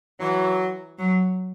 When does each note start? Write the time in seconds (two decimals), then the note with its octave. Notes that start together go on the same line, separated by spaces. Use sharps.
0.20 E3 F#3
0.99 F#3